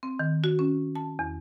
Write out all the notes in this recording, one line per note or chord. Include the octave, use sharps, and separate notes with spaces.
C4
D#3
F#4
C#4
A5
E2